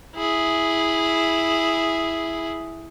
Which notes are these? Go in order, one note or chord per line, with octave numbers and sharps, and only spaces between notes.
E4 G#4